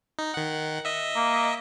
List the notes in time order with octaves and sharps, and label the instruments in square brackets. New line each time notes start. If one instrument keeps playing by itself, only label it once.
[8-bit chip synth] D#4
D#3 F#5
D#5 E5
[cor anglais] A#3